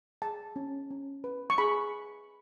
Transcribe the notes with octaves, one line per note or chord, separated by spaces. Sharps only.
G#4 A5
C#4
C#4
B4
C#6
G#4 B5